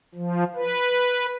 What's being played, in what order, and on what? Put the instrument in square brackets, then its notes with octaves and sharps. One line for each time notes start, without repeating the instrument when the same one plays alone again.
[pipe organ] F3
B4